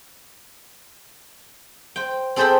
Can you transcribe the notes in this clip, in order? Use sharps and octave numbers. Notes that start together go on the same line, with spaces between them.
C5 G5
C4 G#4 A4 C5 G5 B5